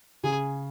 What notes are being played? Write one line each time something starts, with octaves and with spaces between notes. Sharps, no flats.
C#3 G#4